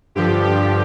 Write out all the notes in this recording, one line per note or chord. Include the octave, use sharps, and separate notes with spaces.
G2 D3 F3 G4
G4